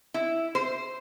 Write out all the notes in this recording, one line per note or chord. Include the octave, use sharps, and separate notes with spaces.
E4
C5